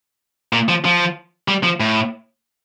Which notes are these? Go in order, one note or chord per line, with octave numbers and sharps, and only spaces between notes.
A#2
F3
F3
G3
F3
A2